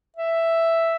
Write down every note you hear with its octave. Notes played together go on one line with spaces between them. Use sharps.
E5